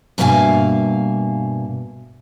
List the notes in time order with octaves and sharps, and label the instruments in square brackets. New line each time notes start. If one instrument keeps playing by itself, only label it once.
[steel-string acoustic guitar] G2 B2 A#3 E5 F5 G#5